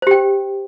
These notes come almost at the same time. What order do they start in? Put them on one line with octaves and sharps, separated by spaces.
C5 G4 G5